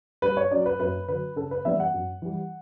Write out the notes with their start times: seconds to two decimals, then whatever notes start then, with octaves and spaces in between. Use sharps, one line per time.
0.22 G2 B4
0.37 C#5
0.51 F#3 C#4 D5
0.66 B4
0.80 F#2 B4
1.08 D3 F#3 B4
1.36 C#3 A4
1.51 B4
1.65 E3 G3 B3 D4 E5
1.80 F#5
1.94 F#2
2.22 E3 G3